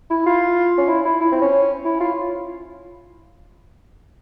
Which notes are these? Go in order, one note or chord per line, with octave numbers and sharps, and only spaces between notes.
E4
F4
C#4
E4
E4
E4
C4
C#4
E4
F4